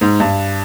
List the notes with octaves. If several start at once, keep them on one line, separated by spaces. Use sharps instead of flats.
G#2
G2